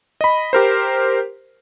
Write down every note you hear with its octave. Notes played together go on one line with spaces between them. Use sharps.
D#5 B5
G4 A#4 C5